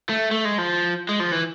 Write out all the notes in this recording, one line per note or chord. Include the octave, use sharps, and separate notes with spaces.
A3
A3
G#3
F3
G#3
F3
E3